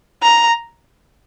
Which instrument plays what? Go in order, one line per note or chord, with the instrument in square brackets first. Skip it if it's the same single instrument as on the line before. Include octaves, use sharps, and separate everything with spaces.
[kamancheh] A#5